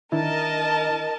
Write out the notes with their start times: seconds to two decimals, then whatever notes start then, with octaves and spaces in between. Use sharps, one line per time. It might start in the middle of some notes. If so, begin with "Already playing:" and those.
0.12 D#3 D4 E4 A#4 D#5 A5